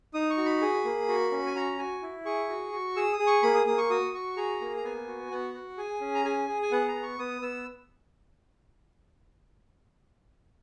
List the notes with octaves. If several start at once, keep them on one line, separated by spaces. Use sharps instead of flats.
D#4 D#6
C#6
F#4
B5
G#4
A#3
F#4
C#4
G#5
F#4 A#5
F#4 G#5
E4
G#4 C#6
F#4
F#4
G#4 E6
D#6
G#4
C#6
A#3 B5
D#6
A#3 D#6
C#6
F#4 D#6
F#4 C#6
G#4 A#5
A#3
A#5
B3 G#5
F#4
B3 F#5
F#4
G#4 G#5
C#4
A#5
G#4 G#5
G#4
G#5
B3 F#5
A#5
B3
C#6
B3 D#6
B3 E6